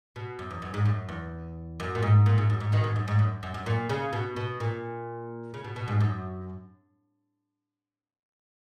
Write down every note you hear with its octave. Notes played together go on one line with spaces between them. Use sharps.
B2
F#2
E2
F#2
G#2
F#2
E2
F#2
A#2
G#2
A#2
G#2
F#2
G#2
B2 D#3
G#2
F#2
G#2
F#2
F#2
F#2
A#2
C#3
B2
B2
A#2
C#3
B2
B2
G#2
F#2